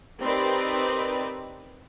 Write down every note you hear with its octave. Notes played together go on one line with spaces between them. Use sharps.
C4 D#4 G4 A#4 B4 D5